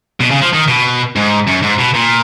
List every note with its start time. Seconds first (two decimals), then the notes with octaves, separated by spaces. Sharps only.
0.21 B2
0.31 C#3
0.42 F3
0.53 D#3
0.68 B2
1.16 G#2
1.48 F#2
1.63 G#2
1.79 B2
1.94 A#2